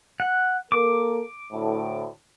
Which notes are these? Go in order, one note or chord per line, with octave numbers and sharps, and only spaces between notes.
F#5
A#3 A4 A#4 D6
D2 A2